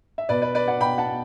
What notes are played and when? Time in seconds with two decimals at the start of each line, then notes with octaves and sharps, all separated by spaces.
0.18 E5
0.29 B2 B4 D5
0.42 B4 D5
0.55 B4 D5
0.68 D5 F#5
0.80 B2 G5 B5
0.98 F#5 A5